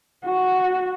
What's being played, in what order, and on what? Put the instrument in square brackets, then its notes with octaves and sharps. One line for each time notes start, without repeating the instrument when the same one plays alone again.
[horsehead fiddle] F#4